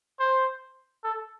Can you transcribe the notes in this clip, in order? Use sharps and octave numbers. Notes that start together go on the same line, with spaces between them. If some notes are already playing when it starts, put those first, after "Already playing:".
C5
A4